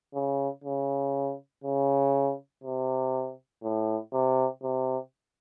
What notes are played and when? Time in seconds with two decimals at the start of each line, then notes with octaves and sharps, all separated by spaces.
0.14 C#3
0.64 C#3
1.64 C#3
2.63 C3
3.63 A2
4.13 C3
4.63 C3